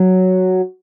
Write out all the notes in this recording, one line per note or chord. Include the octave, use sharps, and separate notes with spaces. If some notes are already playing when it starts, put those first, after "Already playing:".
Already playing: F#3